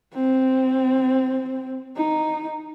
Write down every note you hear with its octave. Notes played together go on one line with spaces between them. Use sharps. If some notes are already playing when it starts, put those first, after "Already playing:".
C4
D#4